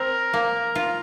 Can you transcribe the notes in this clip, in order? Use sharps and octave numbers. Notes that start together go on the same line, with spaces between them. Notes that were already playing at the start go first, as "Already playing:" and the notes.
Already playing: C4 A#4
A#3
F4